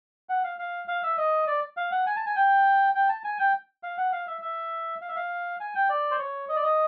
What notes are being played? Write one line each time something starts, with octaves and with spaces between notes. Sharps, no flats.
F#5
F5
F5
F5
E5
D#5
D5
F5
F#5
G#5
A5
G#5
G5
G5
A5
G#5
G5
F5
F#5
F5
E5
E5
F5
E5
F5
G#5
G5
D5
C5
C#5
D#5
D5
D#5